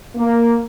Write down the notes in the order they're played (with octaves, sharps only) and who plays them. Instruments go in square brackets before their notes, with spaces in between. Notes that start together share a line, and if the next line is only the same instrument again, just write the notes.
[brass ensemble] A#3